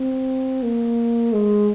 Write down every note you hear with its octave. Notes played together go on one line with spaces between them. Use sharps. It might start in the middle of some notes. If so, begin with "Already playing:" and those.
Already playing: C4
A#3
G#3